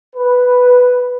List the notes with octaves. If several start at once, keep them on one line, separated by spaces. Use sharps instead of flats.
B4